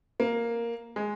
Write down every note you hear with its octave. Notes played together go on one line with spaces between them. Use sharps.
A#3
G#3